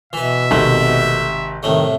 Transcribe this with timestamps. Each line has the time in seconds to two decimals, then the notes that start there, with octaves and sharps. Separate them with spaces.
0.13 B2 E3 B4 E5
0.51 G#1 C3 A3
1.63 C2 A2 D#3 A3